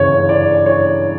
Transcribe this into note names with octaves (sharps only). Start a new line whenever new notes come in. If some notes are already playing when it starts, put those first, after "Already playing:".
Already playing: G1 F#2 C#3 E3 C#5
D5
C#5